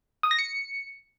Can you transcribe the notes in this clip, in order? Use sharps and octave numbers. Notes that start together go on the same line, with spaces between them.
D#6
A#6
C#7